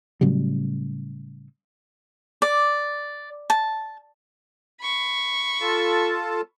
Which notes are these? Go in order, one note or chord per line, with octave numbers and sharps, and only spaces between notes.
A2 C#3 F#3 G3
D5
A5
B5 C#6
F4 A4 A5